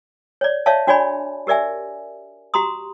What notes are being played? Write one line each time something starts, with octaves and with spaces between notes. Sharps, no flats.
C#5 D5
C#5 D5 E5 F5 A5
D4 F#4 C#5 D5 G#5 B5
G4 A#4 D5 E5 G#5
F#4 G4 A#5 C6 D#6